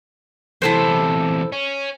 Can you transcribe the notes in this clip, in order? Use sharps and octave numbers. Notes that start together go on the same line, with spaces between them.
E2 C3 E4 A4 C5
C#4